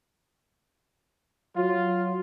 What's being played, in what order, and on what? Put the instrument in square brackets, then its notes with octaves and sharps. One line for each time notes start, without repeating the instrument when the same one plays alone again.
[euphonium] F#3 [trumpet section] F4